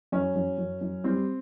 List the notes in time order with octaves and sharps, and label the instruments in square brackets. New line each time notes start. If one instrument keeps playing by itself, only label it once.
[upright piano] F#2 C#4
F#2
F#2
F#2
G3 C4